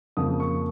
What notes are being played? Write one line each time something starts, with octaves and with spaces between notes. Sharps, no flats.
F2 C#3 F3 A#3 D#6
C#6